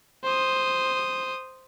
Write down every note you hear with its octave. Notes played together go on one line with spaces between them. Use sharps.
C5 D#6